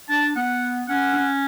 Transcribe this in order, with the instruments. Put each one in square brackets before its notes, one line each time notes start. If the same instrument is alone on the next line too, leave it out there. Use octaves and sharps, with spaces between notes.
[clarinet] D4 [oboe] A5
[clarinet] B3 [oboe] F#5
[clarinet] C#4 [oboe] F#5
[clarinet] C#4